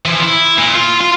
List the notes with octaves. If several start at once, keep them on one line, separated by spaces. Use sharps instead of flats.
E3 F3
E4
A#2
F4
F4